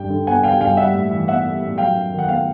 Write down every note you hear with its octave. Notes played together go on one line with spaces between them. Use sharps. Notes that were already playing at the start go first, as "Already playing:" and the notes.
Already playing: G2 G3 G5
D3
B3 F#5 G#5
G3 F5 G5
G2 F5 G5
G3 E5 F#5
A2
E3
B3 E5 F#5
G3
A2
F#3 F5 G5
F#2
D#3
F#5
B3 F5 G5